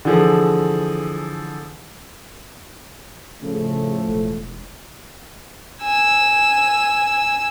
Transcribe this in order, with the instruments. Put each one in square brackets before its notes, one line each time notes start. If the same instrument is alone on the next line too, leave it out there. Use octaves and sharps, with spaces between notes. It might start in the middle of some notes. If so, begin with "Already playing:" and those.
[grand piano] D3 E3 F3 G#4 A4
[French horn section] A2 F3 A3 [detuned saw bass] C#3
[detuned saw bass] E1
[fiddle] G#5 E6